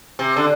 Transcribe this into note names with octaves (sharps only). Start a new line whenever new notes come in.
C3
D3